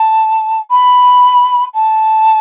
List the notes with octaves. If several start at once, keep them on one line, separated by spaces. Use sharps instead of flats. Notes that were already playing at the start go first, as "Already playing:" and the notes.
Already playing: A5
B5
A5